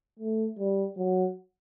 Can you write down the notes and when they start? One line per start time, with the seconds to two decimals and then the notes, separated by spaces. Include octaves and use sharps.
0.19 A3
0.58 G3
0.97 F#3